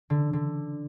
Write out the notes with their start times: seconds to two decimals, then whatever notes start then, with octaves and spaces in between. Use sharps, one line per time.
0.10 D3
0.33 D3